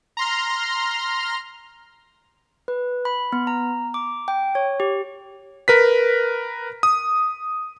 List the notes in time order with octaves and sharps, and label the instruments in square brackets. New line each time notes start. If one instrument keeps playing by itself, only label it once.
[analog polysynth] A#5 C6 F6
[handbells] B4
B5
B3
A#5
D6
G5
C#5
G4
[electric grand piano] A#4 B4 B6
D#6